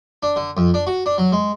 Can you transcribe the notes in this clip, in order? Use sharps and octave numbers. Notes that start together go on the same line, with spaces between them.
D4
D3
F2
D4
F#4
D4
F#3
G#3